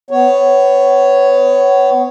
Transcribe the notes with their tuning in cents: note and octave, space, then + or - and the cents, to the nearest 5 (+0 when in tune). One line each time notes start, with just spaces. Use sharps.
B3 +25 C#5 +0